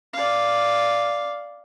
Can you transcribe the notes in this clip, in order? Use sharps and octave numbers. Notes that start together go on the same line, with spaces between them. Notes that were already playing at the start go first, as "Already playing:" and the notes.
D5 F5